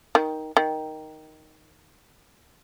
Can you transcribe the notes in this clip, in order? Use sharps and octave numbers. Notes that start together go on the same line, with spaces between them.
D#3
D#3